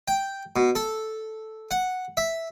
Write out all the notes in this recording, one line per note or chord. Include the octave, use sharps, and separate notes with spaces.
G5
B2
A4
F#5
E5